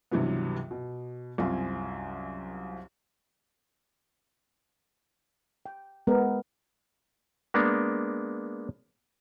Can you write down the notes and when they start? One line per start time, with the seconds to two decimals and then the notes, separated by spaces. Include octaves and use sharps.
0.11 C#2 G2 C3 E3 F#3 B3
0.71 B2
1.38 C2 F#2 C4 F4 F5 G#5
5.66 G5
6.07 G#3 B3 A#4
7.54 G#3 A#3 B3 D4